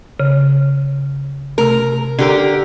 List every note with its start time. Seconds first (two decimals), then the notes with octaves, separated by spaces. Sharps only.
0.20 C#3
1.58 C3 A3 A#4
2.19 D3 G4 A#4